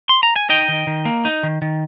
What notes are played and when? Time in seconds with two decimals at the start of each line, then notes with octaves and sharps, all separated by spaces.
0.09 C6
0.23 A#5
0.36 G#5
0.49 D#4 D#5 G5
0.69 D#3
0.87 D#3
1.05 A#3
1.25 D#4
1.43 D#3
1.62 D#3